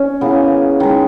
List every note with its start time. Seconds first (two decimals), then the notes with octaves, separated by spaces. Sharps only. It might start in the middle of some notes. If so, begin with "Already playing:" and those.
Already playing: C#4
0.21 C#3 E3 A#3 B3
0.80 D#3 G#3